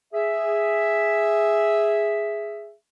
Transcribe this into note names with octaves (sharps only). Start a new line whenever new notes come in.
G#4 E5